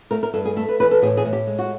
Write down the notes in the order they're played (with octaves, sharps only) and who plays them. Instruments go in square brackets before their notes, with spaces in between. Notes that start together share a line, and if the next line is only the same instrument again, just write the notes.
[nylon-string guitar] A3 A#4
A#4
G2 A4
G#4
A3 A4
B4
E3 B4
A4
A2 G#4
G#4
A2
G4
G#3
F#4